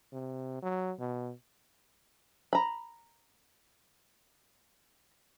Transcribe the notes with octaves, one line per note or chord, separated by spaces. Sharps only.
C3
F#3
B2
A#5 B5